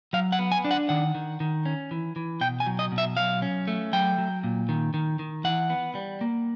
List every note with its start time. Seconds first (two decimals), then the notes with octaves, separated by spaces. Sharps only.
0.13 F#3 F5
0.32 F#5
0.39 B3
0.52 G#5
0.65 D4
0.71 F#5
0.89 D#3 F#5
1.15 D#3
1.40 D#3
1.65 C#4
1.91 E3
2.16 E3
2.41 B2 G5
2.60 G#5
2.66 F#3
2.79 D#5
2.92 B2
2.98 E5
3.17 F#3 F5
3.42 C#4
3.68 A3
3.93 F#3 G5
4.18 F#3
4.44 A#2
4.69 D#3
4.94 D#3
5.19 D#3
5.44 E3 F#5
5.70 B3
5.95 G3
6.21 A#3